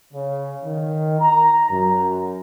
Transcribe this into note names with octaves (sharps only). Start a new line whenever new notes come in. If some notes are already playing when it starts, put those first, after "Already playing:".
C#3
D#3
A#5
F#2